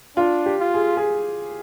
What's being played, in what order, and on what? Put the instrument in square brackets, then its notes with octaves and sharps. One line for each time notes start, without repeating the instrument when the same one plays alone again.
[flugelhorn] D4 [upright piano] F4
[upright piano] G4
[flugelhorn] F4
[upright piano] G#4
G#4